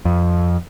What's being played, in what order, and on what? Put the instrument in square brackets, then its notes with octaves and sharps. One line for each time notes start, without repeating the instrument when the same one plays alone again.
[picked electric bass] F2